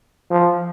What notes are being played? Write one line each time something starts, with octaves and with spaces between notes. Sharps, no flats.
F3